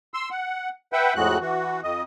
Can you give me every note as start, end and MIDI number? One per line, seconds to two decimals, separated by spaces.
0.14 0.29 84
0.14 0.29 88
0.31 0.69 78
0.93 1.14 71
0.93 1.14 76
0.93 1.14 78
0.93 1.14 79
1.16 1.38 41
1.16 1.38 45
1.16 1.38 56
1.16 1.38 66
1.16 1.38 90
1.41 1.81 52
1.41 1.81 66
1.83 2.03 41
1.83 2.03 75